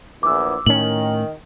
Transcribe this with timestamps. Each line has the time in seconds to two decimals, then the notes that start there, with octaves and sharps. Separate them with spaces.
0.23 A#1 E2 D6 E6
0.66 A2 D#3 C#4 F#7